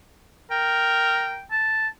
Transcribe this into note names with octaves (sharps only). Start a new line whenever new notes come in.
A#4 G5
A5